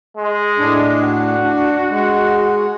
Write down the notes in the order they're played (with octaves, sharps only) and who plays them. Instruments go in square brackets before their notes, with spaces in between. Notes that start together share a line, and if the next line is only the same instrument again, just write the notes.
[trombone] G#3
[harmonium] A2 D4
[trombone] F#4
[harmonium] D4
G#3